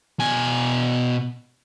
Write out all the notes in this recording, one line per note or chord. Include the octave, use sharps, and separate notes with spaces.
B2 G#5